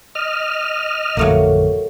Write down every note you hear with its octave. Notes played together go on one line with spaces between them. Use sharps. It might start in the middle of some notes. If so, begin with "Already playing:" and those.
D#5 F6
A1 F2 D3 F#3 A3 A#3